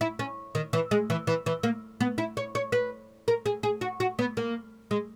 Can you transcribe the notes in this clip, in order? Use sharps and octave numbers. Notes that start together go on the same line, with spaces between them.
E4
C#4
D#3
E3
G#3
E3
E3
E3
A#3
B3
E4
C#5
C#5
B4
A#4
G#4
G#4
F#4
F#4
B3
A#3
G#3